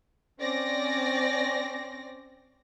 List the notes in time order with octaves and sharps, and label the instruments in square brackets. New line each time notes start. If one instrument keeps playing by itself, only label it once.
[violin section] C4 C#4 D5 A#6